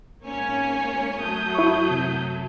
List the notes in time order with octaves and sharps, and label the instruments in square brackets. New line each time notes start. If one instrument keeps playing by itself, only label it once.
[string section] G#1 C#4 C#5 [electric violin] A#3 G#5
[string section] F#2 F#3 A3 [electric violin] D#6 G6
[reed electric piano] E4 C#6
C3